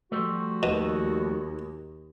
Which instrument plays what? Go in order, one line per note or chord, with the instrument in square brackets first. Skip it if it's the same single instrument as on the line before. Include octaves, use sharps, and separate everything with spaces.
[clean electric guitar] F3 G3 A3 [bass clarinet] F#4
[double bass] D#2 [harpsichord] B2